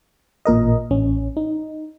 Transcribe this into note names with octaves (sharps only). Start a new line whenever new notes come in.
A1 A#2 A#4 D#5
A1 C#4
D#4